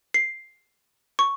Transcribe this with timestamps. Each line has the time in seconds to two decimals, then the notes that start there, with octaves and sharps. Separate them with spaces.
0.14 C7
1.19 C#6